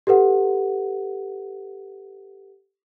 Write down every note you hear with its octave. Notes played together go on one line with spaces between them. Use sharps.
G4 A4 B4 F#5